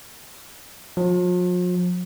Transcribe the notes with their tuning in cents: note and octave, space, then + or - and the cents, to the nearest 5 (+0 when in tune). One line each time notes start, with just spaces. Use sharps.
F3 +45